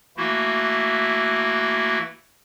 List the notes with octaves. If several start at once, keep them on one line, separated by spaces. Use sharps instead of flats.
E3 A3 A#3 E4 F#4